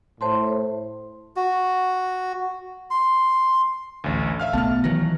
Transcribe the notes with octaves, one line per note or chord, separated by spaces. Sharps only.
A2 C5 A5 C6
F#4
C6
A1 D2
E5 F5 F6
B1 A3 B3 A5 F6
D#3 E3 F#3 A#6